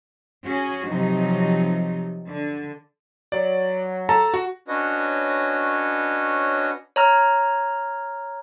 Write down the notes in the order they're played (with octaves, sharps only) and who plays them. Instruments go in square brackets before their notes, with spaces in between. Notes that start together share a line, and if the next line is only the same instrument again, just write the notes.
[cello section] C#4 F#4 G#4
C3 F3 F#3 D#4
D3
[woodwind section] F#3 [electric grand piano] D5
[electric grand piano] A4 A5 A#5
F#4
[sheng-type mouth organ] C#4 D4 F#4 B4 C#5 D#5
[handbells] C#5 A#5 F6